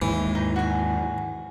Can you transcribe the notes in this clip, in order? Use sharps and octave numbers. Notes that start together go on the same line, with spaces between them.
D#2 G#2 E3
D#4
F#4 G#5